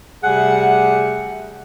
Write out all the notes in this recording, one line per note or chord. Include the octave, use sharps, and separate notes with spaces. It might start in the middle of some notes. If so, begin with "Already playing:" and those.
C3 G3 A3 G#4 F#5